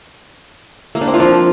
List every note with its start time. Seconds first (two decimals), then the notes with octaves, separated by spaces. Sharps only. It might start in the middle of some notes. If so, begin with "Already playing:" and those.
0.95 A#3
1.01 D4
1.08 C4
1.14 F4
1.20 F3